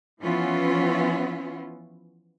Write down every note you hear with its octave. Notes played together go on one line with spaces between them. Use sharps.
E3 F3 B3 C#4 E4 F4